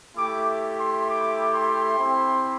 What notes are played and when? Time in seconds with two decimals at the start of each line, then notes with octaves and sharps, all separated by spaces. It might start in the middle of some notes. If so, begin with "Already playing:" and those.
0.16 A3 E4 G4 D6
0.77 C6
1.08 D6
1.53 C6
1.99 C4 E4 G4